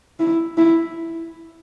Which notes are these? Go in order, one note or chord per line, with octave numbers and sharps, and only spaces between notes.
E4
E4